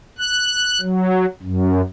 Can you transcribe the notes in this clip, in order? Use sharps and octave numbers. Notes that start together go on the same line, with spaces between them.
F#6
F#3
F#2